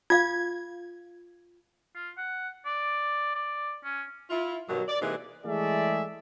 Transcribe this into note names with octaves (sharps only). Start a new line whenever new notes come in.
F4 F5 G#6
F4
F#5
D5
D5
C#4
E4 F4
G2 B2 D#3 F#3
D5
C3 E3 G#3 A#3 D#4
E3 G#3 A3 G#4 D5 E5